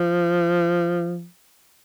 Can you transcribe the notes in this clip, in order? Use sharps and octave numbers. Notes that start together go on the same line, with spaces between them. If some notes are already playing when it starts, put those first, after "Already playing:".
Already playing: F3